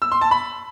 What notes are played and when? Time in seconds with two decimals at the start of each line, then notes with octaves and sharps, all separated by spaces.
0.02 E6
0.12 C6
0.21 A5
0.31 B5